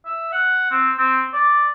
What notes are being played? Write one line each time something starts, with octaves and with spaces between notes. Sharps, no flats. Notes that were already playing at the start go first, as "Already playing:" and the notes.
E5
F#5
C4
C4
D5